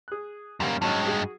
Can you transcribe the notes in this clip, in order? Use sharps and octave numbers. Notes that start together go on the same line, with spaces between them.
G#4 F#6
F#2 G3 A#3 C#4
G2 F#3 G#3 C#4 D#4
F#4 G#4